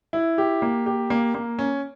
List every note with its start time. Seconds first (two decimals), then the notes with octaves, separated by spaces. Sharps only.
0.13 E4
0.38 G4
0.62 A#3
0.86 G4
1.10 A#3
1.35 A#3
1.59 C#4